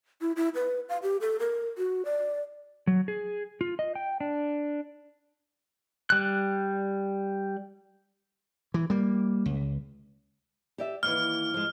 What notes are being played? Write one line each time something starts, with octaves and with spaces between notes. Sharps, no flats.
E4
E4
B4
F5
G4
A4
A#4
F#4
D5
F#3
G#4
F4
D#5
G5
D4
G3 F#6
E3
G3 A#3
C#2
G4 D5 E5
D#2 E3 F6
F3 G#3